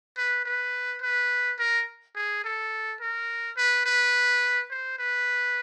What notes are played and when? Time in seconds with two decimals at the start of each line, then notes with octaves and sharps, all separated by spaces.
0.17 B4
0.45 B4
1.02 B4
1.59 A#4
2.15 G#4
2.44 A4
3.01 A#4
3.57 B4
3.86 B4
4.70 C5
4.99 B4